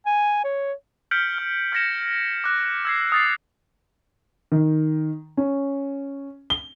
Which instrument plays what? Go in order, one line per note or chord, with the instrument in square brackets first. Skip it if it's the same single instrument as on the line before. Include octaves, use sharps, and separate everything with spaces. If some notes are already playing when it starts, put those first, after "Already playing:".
[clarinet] G#5
C#5
[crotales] F6 G6 B6 C#7 D7 F#7
F6
F6 G6 G#6 A#6 C#7 E7
D6 F#6
E6 G#6 C7
D#6 A6 C7
[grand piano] D#3
C#4
G7